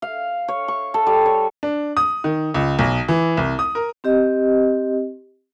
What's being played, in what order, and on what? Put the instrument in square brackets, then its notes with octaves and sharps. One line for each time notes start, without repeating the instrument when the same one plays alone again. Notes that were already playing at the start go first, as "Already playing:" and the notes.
[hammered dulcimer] F5
C#5
C#6
A4
G3
C#5
[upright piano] D4
D#6
D#3
C#2
B1
E3
C2
D#6
A#4
[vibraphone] C4 G4 D#5